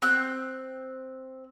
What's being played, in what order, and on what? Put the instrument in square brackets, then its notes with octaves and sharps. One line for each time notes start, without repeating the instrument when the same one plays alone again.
[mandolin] C4 F#6 G6